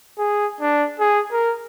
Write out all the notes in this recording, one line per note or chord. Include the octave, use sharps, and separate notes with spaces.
G#4
D4
G#4
A#4